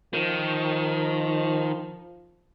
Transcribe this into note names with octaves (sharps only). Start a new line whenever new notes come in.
D#3 F3